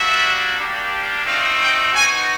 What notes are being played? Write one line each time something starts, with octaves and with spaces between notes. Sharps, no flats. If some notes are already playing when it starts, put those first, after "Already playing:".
Already playing: G3 A#3 D4 F#4 E5
G3 A#3 D4 G4
A3 C4 D#4 F#4 F5
G5
B3 D#4 F#4 G#5